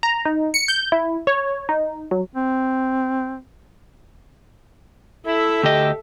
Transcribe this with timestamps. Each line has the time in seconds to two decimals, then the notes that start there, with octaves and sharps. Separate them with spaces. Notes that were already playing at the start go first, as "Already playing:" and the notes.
0.03 A#5
0.25 D#4
0.54 C#7
0.68 G6
0.92 E4
1.27 C#5
1.69 D#4
2.11 F#3
2.34 C4
5.26 E4 A4 E5
5.63 D2 G4 D#5